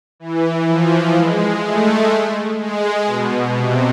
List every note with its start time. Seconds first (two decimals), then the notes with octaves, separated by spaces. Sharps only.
0.20 E3
0.68 F3
1.16 G#3
1.64 A3
2.59 G#3
3.06 B2
3.55 C3